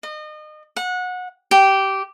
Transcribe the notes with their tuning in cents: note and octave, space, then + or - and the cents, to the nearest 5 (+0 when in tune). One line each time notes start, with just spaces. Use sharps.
D#5 -30
F#5 -25
G4 -15